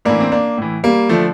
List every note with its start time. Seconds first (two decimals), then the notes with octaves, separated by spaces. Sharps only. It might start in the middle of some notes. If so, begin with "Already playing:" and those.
0.05 A2 E3 A#3 D4
0.20 C4
0.32 A#3 D4
0.57 A2 E3
0.84 G3 A#3
1.09 D3 F3 A3